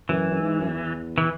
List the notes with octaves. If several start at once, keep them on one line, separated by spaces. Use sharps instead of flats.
F#2 E3
F#2
G#2
F#2
E2
E3